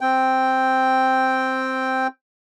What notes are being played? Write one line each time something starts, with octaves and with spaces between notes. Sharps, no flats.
C4 G5